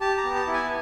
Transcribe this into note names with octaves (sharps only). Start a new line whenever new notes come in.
G4 A5
A#5
B3
A5
E4
G#5